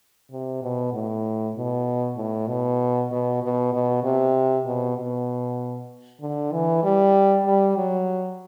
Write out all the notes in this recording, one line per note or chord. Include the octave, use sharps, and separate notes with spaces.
C3
B2
A2
B2
A2
B2
B2
B2
B2
C3
B2
B2
D3
E3
G3
G3
F#3